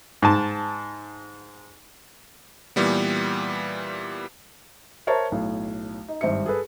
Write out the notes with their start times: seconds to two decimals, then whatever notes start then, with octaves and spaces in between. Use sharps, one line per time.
0.22 G#2 A5
2.76 A#2 E3 G3 B3
5.07 A#4 C5 C#5 E5 A5 A#5
5.32 B1 A2
6.08 D#4
6.21 G#1 G2 C5 E5 C#7
6.46 G#4 A4 B4